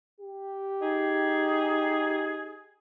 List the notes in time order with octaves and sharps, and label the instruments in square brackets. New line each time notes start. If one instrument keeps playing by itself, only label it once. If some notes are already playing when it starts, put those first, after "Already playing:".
[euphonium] G4
[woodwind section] D#4 G#4